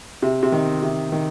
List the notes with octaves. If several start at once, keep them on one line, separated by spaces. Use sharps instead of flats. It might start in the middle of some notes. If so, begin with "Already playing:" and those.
C3
C3
D#3
C3
D#3